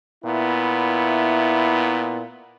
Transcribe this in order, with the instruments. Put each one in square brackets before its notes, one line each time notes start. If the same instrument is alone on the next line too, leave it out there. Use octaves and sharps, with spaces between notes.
[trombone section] A#2 B3 E4